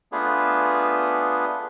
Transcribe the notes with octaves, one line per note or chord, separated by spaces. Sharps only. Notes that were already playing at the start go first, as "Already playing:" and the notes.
A3 B3 D4 F4 G#4 B4